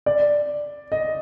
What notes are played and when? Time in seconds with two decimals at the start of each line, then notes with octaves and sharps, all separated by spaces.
0.06 D5
0.92 D#5